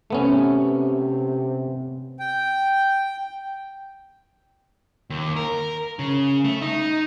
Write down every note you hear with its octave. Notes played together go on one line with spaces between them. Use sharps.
C3 A3 B3 C#4
G5
D#2
A#4
C#3
A3
D#4